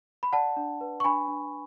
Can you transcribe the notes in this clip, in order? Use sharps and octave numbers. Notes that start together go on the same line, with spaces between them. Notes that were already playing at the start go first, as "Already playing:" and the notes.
B5
D5 F#5 A5
D4
B4
C#6
D4 G#5 B5
D4